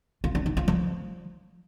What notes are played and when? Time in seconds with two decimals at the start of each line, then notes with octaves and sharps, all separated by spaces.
0.24 F4
0.35 D4
0.46 D#4
0.57 F4
0.68 F3